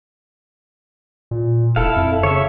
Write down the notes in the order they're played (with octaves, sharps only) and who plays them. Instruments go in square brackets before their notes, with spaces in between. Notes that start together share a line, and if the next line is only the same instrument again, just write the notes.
[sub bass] A#2
[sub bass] E1 [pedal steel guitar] E4 A4 F5
[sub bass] F2
[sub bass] C#3 [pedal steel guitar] C#5 E5